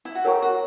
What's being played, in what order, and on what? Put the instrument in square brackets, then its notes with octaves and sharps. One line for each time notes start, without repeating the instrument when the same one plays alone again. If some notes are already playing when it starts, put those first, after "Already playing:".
[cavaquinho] E4
F#4
[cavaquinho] G4 [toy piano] A#4 C#5 F#5 A#5 C#6
[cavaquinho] F#4